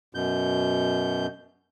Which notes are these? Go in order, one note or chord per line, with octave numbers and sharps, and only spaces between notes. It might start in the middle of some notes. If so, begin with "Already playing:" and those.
F#2 B2 G6